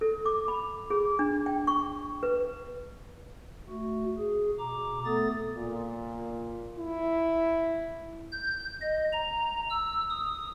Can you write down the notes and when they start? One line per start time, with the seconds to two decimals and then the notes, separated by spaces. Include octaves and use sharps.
0.01 A4
0.26 D6
0.48 B5
0.90 G#4
1.19 D4
1.46 G5
1.67 C#6
2.23 B4
3.69 A3 F#4
4.18 G#4
4.59 B2 A#5 D6
5.05 A3 B3 A4 D#6 A6
5.57 A#2
6.79 E4
8.32 G6
8.82 D#5
9.12 A#5
9.70 E6
10.10 D#6